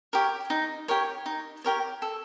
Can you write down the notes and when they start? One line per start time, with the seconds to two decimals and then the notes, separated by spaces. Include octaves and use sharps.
0.13 G4 A#4 C#5
0.50 D#4
0.88 G4 A#4 C#5
1.26 D#4
1.64 G4 A#4 C#5
2.02 A4